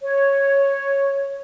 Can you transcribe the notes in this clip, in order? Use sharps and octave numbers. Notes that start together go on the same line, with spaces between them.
C#5